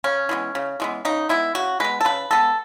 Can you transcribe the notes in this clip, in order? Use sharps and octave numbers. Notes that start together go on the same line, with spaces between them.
C#3 C#4
E3 G#3 B3
C#3
E3 G#3 B3
C#3 D#4
G#3 B3 E4
C#3 F#4
G#3 B3 B4
A4
C#3 B4
G#3 B3 A4